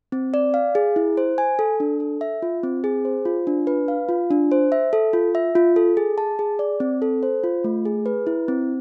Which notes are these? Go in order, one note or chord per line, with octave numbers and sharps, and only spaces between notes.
C4
D5
F5
G#4
E4
C5
G#5
A4
D4
A4
E5
F4
C4
G#4
C5
F4
D4
B4
F5
F4
D4
C5
E5
A4
F4
E5
F4
A4
G#4
A5
G#4
D5
C4
A4
C5
F4
A3
G#4
B4
E4
C4